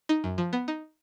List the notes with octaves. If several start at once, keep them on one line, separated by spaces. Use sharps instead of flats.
D#4
F#2
F3
B3
D#4